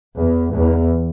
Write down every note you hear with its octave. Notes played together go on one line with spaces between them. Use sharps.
E2
E2